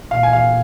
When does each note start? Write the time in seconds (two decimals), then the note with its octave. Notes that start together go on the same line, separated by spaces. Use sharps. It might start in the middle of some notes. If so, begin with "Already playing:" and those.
0.11 A#2 F5
0.23 G#5
0.33 F5